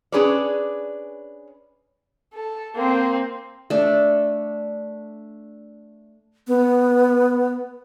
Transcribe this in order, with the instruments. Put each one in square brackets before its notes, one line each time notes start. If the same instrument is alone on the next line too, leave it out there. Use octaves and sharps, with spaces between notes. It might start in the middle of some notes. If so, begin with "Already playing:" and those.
[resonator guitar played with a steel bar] C#4 D4 G#4 B4 C#5 D5
[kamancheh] A4
A#3 C4
[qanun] A3 D4
[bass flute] B3